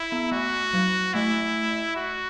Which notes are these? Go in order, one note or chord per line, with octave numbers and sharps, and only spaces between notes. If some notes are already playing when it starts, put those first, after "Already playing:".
Already playing: E4
B3
A3 F#4
F#3
A3 E4
F#4